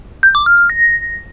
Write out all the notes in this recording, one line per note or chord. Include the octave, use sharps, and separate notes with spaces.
G6
D6
F6
F6
A#6